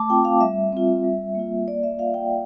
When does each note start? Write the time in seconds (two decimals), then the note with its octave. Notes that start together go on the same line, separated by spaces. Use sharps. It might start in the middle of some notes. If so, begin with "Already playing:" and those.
Already playing: A3 A5 D6
0.10 C4 F4 G5
0.25 F5
0.40 G3 E5
0.72 C4 F4
1.04 G3
1.35 A#3 F4
1.67 A#3 D5
1.83 E5
1.99 F4 F5
2.14 G5